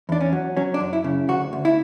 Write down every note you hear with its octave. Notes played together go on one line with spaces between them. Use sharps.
E2 D4
C#4
F#3
F#3 C#4
D4
F#2
E4
C#3
D2 F#4
D2
E4